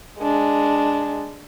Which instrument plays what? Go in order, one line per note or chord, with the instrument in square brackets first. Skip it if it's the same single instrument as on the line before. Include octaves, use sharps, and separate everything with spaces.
[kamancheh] G#3 D4